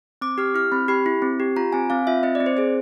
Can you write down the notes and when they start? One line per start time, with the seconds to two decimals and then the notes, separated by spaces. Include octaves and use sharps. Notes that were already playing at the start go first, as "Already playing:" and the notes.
0.21 C4 D6
0.38 G4 F6
0.55 E4 F6
0.72 C4 B5
0.88 G4 B5
1.06 E4
1.22 C4
1.40 G4
1.57 F4 A#5
1.73 C4 G#5
1.90 C4 F5
2.07 F4 E5
2.23 C4 D#5
2.35 D5
2.40 C4
2.46 C5
2.57 G#4 C5